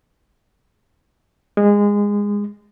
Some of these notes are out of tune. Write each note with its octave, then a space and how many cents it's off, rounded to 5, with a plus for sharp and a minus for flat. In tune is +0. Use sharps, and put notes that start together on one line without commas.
G#3 -20